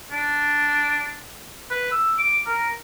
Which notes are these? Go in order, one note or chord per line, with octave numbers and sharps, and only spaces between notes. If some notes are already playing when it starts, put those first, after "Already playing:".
D4
B4
E6
D6
A#4